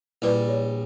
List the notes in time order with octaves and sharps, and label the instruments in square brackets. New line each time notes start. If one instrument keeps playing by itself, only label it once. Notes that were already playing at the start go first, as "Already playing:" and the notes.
[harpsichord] A#1 G3 [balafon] E4 B4 D5
[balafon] C#5